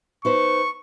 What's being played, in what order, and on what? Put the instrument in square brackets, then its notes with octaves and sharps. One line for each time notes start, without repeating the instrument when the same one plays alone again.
[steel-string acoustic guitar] D#4 B4 C5 [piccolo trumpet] C#6